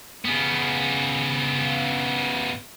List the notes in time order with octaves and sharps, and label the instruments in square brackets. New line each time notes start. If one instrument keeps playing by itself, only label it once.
[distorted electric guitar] C#3 B3